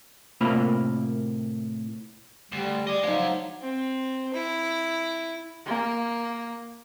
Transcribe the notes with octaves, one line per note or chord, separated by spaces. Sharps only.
A2 C3 A#3 F4 A#4 B5
D2 G3
D5 D#5 G#5
F3 F#3 G#3 D#4 C#5
C4
E4
A#3